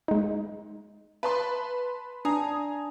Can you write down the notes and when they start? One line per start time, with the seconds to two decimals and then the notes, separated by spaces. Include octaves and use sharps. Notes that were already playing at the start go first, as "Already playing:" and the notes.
0.08 G#3 D#4
1.23 B4 A5 C6
2.25 D4 G#5 A#5 D#6 C7